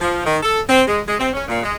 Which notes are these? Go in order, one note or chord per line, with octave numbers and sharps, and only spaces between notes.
F3
D#3
A4
C4
G#3
G#3
C4
C#4
A#2
G#3